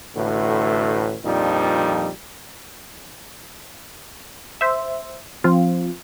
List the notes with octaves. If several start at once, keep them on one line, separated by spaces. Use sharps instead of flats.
A1 A2 D3 A3 F#4 B4
F2 A#2 F3 G3 D4 D#4
C5 E5
F3 C4 F4